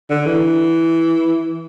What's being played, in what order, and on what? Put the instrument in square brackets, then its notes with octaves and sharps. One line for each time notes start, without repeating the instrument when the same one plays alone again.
[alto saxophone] D3
E3